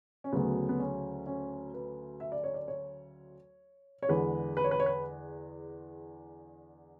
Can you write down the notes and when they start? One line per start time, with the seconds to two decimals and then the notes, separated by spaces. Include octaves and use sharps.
0.24 C#4
0.32 D2 C#3 F#3 A3 B3
0.69 B3
0.80 C#4
1.26 C#4
1.74 B4
2.20 E5
2.32 D5
2.44 C#5
2.54 D5
2.68 C#5
4.02 C#5
4.09 E2 D3 G#3 B4
4.57 B4
4.64 C#5
4.71 B4
4.80 C#5
4.86 B4